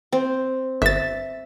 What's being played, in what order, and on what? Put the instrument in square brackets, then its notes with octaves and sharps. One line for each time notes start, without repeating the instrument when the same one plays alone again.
[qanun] C4
[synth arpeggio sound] G1 A6 [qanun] E5